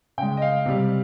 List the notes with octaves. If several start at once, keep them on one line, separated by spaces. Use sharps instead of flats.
C#3 G#3 G5
D#5
F5
C3 G3